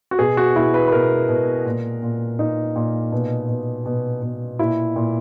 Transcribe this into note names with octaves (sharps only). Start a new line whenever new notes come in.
F#4
B2 G#4
F#4
B2 E4
B4
B4
B2 A#4
B2
A#2
A#2
A#2 D#4
A#2
B2
B2
B2
B2
A#2 E4
A#2